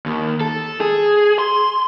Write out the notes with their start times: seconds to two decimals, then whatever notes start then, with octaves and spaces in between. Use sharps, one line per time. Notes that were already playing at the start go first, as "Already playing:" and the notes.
0.06 D#2
0.41 A4
0.81 G#4
1.39 C6